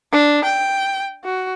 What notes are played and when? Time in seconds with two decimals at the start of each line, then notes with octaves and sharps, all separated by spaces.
0.12 D4
0.44 G5
1.24 F#4